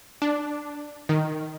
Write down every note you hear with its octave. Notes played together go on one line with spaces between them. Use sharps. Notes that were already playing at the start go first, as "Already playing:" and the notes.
D4
D#3